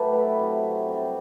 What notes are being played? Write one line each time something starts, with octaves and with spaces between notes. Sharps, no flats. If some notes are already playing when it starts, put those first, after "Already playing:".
Already playing: A2 F#3 G4 A4 B4
E4
C3 F#3
C3 G3 D5